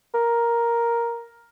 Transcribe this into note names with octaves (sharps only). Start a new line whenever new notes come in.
A#4